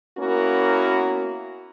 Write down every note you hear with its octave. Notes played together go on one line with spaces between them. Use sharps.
A#3 B3 C#4 E4 F#4 A#4